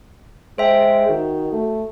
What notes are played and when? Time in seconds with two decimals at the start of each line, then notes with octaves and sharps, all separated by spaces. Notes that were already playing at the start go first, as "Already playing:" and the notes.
0.58 G#3 C5 E5 G5
1.09 D#3 F#4
1.52 A3